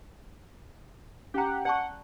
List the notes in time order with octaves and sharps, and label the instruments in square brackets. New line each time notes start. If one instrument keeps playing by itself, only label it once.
[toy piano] C#4 G5 A#5 [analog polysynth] G4 F#5
[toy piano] D5 A5 C#6 [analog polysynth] F#5